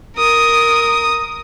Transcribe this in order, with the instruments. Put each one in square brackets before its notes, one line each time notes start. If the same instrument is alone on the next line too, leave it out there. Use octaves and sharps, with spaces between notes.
[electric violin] A#4 D#6